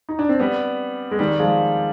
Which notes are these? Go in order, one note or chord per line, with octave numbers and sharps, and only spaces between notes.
D#4
D4
C4
G3 B3
G#3
D#3 G3
F3 G#3